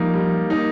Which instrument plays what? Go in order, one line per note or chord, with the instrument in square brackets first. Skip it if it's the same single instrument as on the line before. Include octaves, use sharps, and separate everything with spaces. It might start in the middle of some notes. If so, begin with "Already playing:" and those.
Already playing: [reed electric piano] F3 [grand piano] G3 A#3 D#4
[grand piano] G3
A#3 D#4